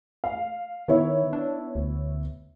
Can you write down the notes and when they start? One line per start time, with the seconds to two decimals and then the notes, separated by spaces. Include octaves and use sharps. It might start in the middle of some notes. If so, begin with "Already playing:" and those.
0.24 F5
0.88 D#3 B3 E4 C#5
1.33 D4
1.75 D2